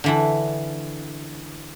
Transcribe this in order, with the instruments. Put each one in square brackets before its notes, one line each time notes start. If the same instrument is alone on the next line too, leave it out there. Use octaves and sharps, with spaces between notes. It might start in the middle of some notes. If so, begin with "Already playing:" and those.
[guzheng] D3 E3 E4